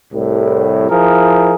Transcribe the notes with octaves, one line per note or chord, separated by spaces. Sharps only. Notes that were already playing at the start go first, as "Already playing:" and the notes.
C2 A2
F3 E4 G#4 A#4